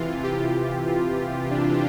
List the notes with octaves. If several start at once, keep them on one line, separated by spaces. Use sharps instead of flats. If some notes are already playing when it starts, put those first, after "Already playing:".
Already playing: C3 E3 F4
G4
F4
D4